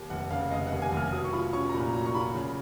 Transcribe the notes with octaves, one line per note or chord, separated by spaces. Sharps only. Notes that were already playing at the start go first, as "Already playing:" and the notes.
Already playing: D#2
F1 F#5
C#3 F5
F1 D#5
F#5
D#2
G#5
F1 F6
F#3 D#6
C#6
F4 B5
C#4 C#6
A#5
A#2 B5
F#3 A#5
C#6
F4 B5
C#3